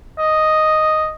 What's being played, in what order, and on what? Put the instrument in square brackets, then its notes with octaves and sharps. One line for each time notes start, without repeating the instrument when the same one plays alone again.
[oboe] D#5